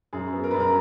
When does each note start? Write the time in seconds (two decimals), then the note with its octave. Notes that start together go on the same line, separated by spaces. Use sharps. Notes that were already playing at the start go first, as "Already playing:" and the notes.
0.13 F#2 G#4
0.33 B3
0.44 A#4
0.51 F#2 B4
0.60 A#4